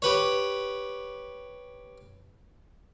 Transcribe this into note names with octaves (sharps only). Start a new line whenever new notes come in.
G4 B4 C#5